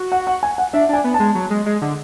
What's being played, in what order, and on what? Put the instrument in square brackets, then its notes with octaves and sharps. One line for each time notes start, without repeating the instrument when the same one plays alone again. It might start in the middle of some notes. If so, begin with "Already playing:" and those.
Already playing: [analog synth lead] F#4
[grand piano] F#5
F#5
G#5
F#5
[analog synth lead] D4 [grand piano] E5
[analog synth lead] D4 [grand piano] G#5
[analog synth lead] B3
[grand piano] A5
[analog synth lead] G#3
F#3
G#3
G#3
D3